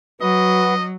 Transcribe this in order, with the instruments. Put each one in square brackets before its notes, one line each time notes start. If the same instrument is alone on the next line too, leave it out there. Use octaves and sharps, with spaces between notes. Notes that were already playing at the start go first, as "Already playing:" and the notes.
[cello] F#3 [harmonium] F#4 B4 [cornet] D#5